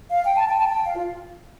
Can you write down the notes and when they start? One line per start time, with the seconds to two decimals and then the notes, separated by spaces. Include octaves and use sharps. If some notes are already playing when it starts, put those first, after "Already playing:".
0.11 F5
0.23 G5
0.36 A5
0.48 G5
0.59 A5
0.67 G5
0.86 F5
0.95 F4